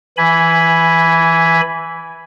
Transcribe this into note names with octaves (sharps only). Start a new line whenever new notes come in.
E3 G#5 B5